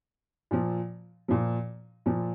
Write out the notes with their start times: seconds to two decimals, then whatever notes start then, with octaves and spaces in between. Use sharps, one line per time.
0.51 A#2 F3
1.28 A#2 F3
2.06 A#2 F3